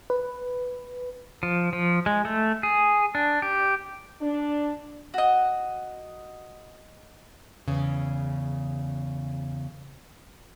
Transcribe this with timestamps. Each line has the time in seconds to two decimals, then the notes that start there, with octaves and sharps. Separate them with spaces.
0.10 B4
1.43 F3
1.73 F3
2.06 G#3
2.25 A3
2.63 G#4
3.15 D4
3.42 G4
4.21 D4
5.14 F#4 D#5
7.68 E2 C#3